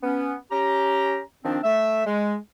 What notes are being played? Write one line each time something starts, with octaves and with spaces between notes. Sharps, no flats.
B3 C#4
C#4 G4 A#5
D#3 F3 C4 D4
A3 E5
G#3